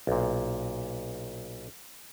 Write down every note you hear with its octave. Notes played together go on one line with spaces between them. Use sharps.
B1 A#2